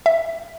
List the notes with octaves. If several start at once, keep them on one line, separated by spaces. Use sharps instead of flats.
E5